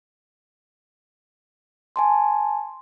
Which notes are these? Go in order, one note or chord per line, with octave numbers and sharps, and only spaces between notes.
G#5 A5 C6